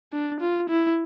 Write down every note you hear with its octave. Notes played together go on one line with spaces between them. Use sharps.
D4
F4
E4